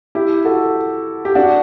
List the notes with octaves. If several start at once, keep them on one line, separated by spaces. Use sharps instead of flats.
E4 G4
F#4 A4
G4
D4 F#4